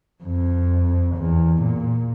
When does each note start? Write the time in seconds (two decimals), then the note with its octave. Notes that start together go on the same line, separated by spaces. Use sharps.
0.23 F2
1.16 E2
1.62 A#2